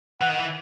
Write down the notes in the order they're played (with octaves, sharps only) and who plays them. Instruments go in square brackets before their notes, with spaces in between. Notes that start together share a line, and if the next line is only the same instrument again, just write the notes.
[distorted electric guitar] E3 [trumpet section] F#5
[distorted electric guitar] D#3
E3